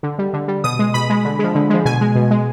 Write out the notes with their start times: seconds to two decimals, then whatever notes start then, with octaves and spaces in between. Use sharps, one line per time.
0.03 D3
0.19 G3
0.33 D3
0.48 G3
0.64 B2 D#6
0.79 G#3
0.94 B2 B5
1.10 G#3
1.25 D3
1.39 F3 G#3
1.55 D3
1.70 F3 G#3
1.85 B2 G#5
2.01 G#3
2.15 B2
2.31 G#3